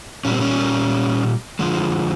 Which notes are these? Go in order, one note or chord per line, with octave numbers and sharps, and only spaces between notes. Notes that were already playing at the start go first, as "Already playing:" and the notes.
A#2 G3 C#4
C4
C#4
D3 F3 G#3